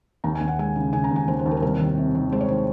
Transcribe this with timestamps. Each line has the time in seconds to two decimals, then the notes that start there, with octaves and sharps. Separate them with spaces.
0.24 D#2 A#5
0.35 G#5
0.41 D#2
0.48 F#5
0.59 G#3 G#5
0.76 C#3
0.93 C#3 G#5
1.04 A#5
1.11 D#2 G#5
1.28 D#2 C5
1.39 C5
1.46 D#2
1.51 A#4
1.57 C5
1.62 C2 A#4
1.79 D#3
1.97 C3
2.15 D#3
2.32 G#3 C5
2.41 C#5
2.48 D#3 C5